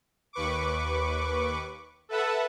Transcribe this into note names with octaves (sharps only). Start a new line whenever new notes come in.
D#2 B4 C#6 D6
A4 B4 E5 F#5 A5